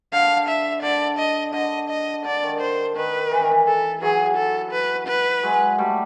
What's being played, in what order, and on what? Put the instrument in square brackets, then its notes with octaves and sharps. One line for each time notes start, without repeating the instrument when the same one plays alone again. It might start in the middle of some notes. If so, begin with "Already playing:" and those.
[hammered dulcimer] D3 [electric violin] F5
[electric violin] E5
[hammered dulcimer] D3 [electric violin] D5
[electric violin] D#5
[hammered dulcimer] D3 [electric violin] D#5
[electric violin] D#5
[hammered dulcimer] D3 [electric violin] D5
[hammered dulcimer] D#3
[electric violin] C5
[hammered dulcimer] D#3 [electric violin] B4
[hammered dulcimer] E3
D#3
E3
[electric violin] A4
[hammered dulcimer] E3 F#3 [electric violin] G#4
[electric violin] A4
B4
B4
[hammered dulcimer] F#3 G#3
G3 A3